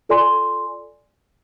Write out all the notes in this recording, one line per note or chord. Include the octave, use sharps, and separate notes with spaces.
F4 A4 D5 G#5 C6